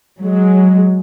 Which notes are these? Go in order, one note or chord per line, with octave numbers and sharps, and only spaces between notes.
F#3 G#3